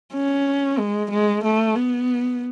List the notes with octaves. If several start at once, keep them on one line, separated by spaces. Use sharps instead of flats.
C#4
G#3
G#3
A3
B3